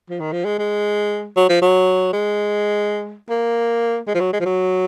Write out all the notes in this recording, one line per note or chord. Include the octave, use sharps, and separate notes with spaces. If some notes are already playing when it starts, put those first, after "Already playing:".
F3
D#3
F3
G#3
G#3
F#3
F3
F#3
G#3
A#3
G#3
F3
F#3
G#3
F3
F#3